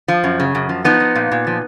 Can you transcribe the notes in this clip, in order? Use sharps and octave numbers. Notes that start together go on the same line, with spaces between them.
F3
F#2
C#3
F#2
F3
F3 B3 D#4
F3
A#2
A#2
F3